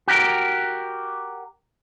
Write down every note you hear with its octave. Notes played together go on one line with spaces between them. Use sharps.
F#4 G4 A#4